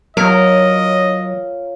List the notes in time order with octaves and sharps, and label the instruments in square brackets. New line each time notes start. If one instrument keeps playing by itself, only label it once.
[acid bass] F#3 [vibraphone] F4 C#5 F5 [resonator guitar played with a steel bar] A#4 [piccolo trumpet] D#5